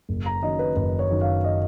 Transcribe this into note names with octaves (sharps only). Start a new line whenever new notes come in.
F#1
A#5
F#2 D#3 F#3 D#5
B4
F#1 B4
C#5
F#2 D#3 F#3
F5
D#5